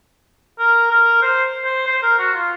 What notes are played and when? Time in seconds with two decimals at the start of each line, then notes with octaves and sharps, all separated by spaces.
0.59 A#4
0.91 A#4
1.22 C5
1.65 C5
1.87 C5
2.03 A#4
2.19 F#4
2.34 F4